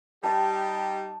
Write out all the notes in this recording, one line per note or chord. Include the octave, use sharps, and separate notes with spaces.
G3 D#4 G4 A5